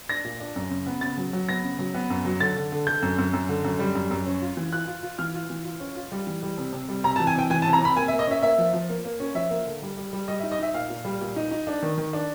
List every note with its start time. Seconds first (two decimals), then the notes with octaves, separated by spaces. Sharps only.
0.09 D4 A#6
0.25 A#2
0.40 D4
0.56 F#2
0.70 C#3
0.87 B3
1.01 C#3 A6
1.17 F#3
1.33 F#3
1.48 B3 A#6
1.64 C#3
1.79 F#3
1.94 B3
2.10 F#2
2.25 F#3
2.40 D3 A6
2.56 D3
2.72 D3
2.87 D3 G6
3.02 F#2
3.18 F#2
3.33 F#2
3.49 D3
3.64 F#2
3.79 G3
3.95 F#2
4.11 F#2
4.26 C#4
4.42 F4
4.57 E3
4.72 F4 F#6
4.88 F4
5.03 F4
5.18 E3 F6
5.34 F4
5.50 E3
5.65 F4
5.80 C#4
5.96 F4
6.12 G3
6.27 E3
6.43 G3
6.58 C3
6.73 C3
6.89 G3
7.04 C3 A#5
7.16 A5
7.20 E3
7.27 G#5
7.35 C3 G5
7.50 E3 G#5
7.62 A5
7.66 C3
7.73 A#5
7.81 C3 B5
7.96 A#3 G#5
8.08 E5
8.12 A#3
8.19 D#5
8.27 C#4 E5
8.43 A#3 E5
8.58 F3
8.74 F3
8.89 A#3
9.05 A#3
9.20 C#4
9.35 F3 E5
9.50 A#3
9.66 D3
9.82 G3
9.97 G3
10.13 G3
10.28 G3 D#5
10.40 E5
10.43 D#4
10.52 D#5
10.59 D#4 E5
10.74 A#2 F5
10.90 A#2
11.05 G3
11.21 A#2
11.36 D#4
11.51 D#4
11.67 D4
11.82 D#3
11.98 D#3
12.13 D4